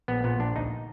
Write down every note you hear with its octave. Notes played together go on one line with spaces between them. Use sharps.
A#1 B3
A#2 B3
A#1 D4
D2 D#4